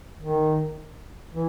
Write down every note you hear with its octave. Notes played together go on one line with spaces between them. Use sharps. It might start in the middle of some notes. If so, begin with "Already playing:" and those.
D#3
E3